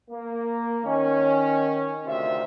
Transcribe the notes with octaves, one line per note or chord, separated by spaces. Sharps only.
A#3
D#3 C#4
D2 C3 D#3 F4 E5